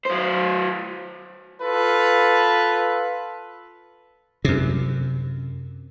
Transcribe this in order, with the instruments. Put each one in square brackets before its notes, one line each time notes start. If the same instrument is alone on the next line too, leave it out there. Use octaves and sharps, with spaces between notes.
[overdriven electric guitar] F#3 C5
[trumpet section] F4 A4 B4
[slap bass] F#2 C3